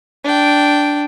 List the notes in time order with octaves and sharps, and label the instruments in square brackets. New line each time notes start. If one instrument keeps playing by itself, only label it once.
[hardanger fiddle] D4 G5